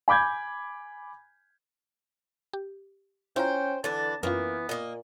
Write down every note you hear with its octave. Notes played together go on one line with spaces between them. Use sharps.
G#5 B5 D6 G6 G#6
G4
C#4 E4 F4 C5 G5 A#5
D3 E3 D4 A5
F#2 E3 A#3 B3 C#4 F4
A#2 A#3 D#5